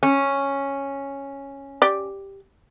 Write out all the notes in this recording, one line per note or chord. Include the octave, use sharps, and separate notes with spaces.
C#4
G4 D5